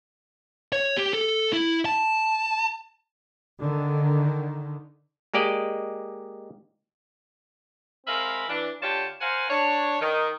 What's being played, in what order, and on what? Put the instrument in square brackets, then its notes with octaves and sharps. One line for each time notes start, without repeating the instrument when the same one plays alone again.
[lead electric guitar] C#5
G4
A4
E4
A5
[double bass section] D3 D#3
[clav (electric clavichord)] G#3 A#3 G4 D5 D#5
[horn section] G#3 C4 A#4 E5 F5 B5
E3 D4
D3 D4 F4 G4 C#5 A5
A#4 C5 F5 F#5 G#5
D4 C#5
D#3